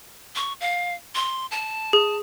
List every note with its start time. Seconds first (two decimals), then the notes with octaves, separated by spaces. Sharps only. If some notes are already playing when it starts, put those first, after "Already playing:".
0.36 C#6
0.61 F5
1.15 C6
1.51 A5
1.93 G#4